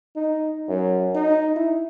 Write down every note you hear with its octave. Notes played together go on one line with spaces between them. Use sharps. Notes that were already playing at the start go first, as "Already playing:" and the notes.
D#4
F#2
D#4
E4